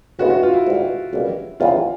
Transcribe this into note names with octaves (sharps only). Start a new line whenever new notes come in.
D2 C#3 E3 G#3 B3 F#4
F#4
F4
E4
G#2 E3 G3
C#2 B2 G3 A#3
E2 C#3 E3 G#3 C4 F4